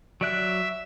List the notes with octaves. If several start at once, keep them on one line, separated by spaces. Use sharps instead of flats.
F#3 D5 E5 F#6